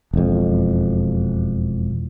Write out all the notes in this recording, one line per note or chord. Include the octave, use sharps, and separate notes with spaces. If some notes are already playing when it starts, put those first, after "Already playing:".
E1 F2